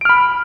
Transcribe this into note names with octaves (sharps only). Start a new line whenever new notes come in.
B5 F6 D7